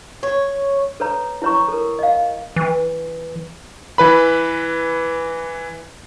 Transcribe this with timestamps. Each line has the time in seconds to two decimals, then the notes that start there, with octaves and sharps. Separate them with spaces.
0.23 C#5
1.00 A4 B4 C#5 A#5
1.42 E4 B4 C#5 A#5 C#6
1.68 A4 A#4
1.99 D#5 F5
2.56 E3
3.98 E3 B4 B5